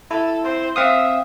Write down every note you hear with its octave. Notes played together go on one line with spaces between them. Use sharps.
E4 A4
C4 C5
C4 E5 F5 D#6